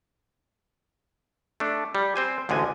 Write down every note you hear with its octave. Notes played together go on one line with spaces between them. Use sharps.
A3 D4
G3
C4 C5 G#5
A1 D2 D3 G#3 G#5